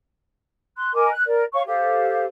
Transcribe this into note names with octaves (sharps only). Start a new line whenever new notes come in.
C6 F#6
A#4 D#5 G#5 D6
F#6
A#4 D5
C#5 F5 C#6
G4 A4 C5 F5